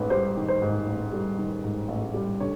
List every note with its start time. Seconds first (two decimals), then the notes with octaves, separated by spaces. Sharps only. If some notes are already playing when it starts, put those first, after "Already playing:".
Already playing: A1 G#2 D#3 B4
0.10 G3 C5
0.37 D#3
0.48 C5
0.62 G#2
0.87 A1
1.13 G3
1.38 D#3
1.64 G#2
1.88 A1
2.14 G3
2.40 D3 C#5